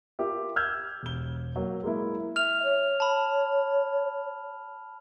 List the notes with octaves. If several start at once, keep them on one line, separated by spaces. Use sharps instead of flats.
F4 G4 A#4 E5
E6 F6 G6 G#6
E1 G7
F#3 A#3
G#3 A#3 E4
E5 F6 F7
C#5
A5 B5